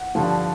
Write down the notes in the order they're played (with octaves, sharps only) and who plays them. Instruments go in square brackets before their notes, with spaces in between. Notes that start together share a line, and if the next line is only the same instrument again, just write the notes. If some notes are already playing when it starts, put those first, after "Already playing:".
Already playing: [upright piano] F#5
G2 D3 F3